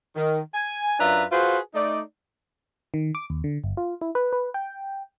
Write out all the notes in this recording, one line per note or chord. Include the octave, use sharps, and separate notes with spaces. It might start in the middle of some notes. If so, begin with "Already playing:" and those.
D#3
G#5
F#2 D4 F4 B4 E5 A#5
F4 F#4 G#4 B4 C5
A3 D#4 D5
D#3
D6
D#2
D3
G1
F4
E4
B4
B4
G5